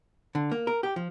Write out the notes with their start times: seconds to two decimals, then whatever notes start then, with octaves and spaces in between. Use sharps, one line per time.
0.35 D3
0.52 A#3
0.67 A#4
0.83 G4
0.96 F3